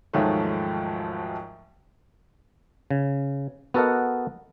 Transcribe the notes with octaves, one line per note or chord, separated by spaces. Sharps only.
D#2 G#2 F3 F#3 G#3 A3
C#3
B3 F#4 A4 A#4 D#5 F#5